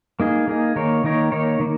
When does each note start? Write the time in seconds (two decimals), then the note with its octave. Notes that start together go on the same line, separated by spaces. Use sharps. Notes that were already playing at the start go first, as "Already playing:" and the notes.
0.20 A#3 D#4 G#4
0.48 A#3 D#4 G#4
0.76 D#3 A#3 D#4 A#4 C#5
1.04 D#3 A#3 D#4 A#4 C#5
1.32 D#3 A#3 D#4 A#4 C#5
1.60 D#3 A#3